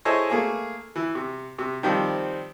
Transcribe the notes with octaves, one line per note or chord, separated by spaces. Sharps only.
E4 G#4 A4 C5 C#5 D#5
A3 A#3 G#4
E3
C3
C3
D#3 F3 G3 C4